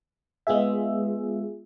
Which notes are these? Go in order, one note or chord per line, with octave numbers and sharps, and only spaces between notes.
G#3 B3 F4 G#4 E5